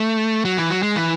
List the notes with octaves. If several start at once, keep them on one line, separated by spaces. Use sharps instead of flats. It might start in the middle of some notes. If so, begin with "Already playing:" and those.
Already playing: A3
F#3
E3
F#3
G#3
E3